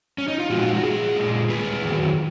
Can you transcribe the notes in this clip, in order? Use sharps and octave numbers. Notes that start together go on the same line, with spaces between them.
C#4
D#4
F4
A#2 F3 G#3 D#4 F#4
F4
F#4
A#2 F3 G#4
A#2 G#3
A#2 G#3 G#4 B4
F2 D#3 F#3